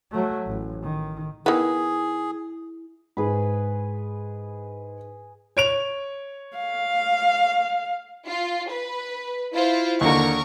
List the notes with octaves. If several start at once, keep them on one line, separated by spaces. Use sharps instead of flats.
F#3 A3
A1
D#3
D#3 B3 E4 G#4
G#2 G#4 B4 B5
C#5 D7 F7
F5
F4
B4
E4 F4 C5
D#2 D3 A#4 C#6